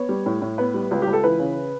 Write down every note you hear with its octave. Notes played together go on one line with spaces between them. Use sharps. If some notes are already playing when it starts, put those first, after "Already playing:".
Already playing: B3 C#5
G3
A2
A2
B3 B4
G3
C#2
C#2 G4
A4
E3 B4
C#3